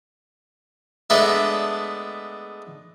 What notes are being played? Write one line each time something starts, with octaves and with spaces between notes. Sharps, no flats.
G#3 A3 B3 D4 E5